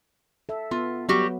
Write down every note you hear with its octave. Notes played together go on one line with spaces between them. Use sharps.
A4 E5
B3 F4
F#3 G3 B3 F#4 G4